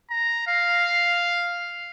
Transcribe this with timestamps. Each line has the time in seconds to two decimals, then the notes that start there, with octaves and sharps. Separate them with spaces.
0.11 A#5
0.48 F5